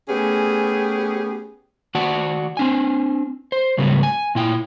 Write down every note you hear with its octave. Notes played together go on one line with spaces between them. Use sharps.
A3 B3 C#4 G4 G#4
D#3 F#4 D5 F#5 A5
C4 D4 G#5
C5
G#2 C#3 F#3 G3 A3 B3
G#5
A#2 E4 G5